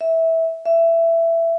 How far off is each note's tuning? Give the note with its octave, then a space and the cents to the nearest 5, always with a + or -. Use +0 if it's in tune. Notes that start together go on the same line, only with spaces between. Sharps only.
E5 -15
E5 +15